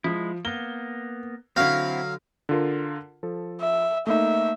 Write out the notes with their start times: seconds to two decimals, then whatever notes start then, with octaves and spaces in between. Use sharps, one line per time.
0.04 F3 G#3 E4
0.45 A#3 B3 G7
1.56 D3 F#3 C4 E4 F5 A#6
2.49 D3 F4 A#4
3.23 F3 A4
3.60 E5
4.07 A3 A#3 D#4 E5